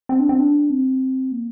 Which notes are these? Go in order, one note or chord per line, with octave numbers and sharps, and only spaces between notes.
C4
D4
C4
D4
C4
A#3